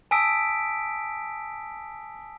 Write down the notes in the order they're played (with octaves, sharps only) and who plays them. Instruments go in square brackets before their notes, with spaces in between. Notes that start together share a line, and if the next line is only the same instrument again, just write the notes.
[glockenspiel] G#5 A5 D#6 E6 B6 D7